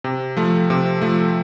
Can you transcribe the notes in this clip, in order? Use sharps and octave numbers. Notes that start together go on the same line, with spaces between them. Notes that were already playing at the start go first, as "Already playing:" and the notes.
C3
F3 A3
C3
F3 A3